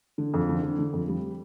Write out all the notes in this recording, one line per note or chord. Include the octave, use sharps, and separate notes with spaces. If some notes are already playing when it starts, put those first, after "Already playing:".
D3
F2
D3
D3
D3
F2
G3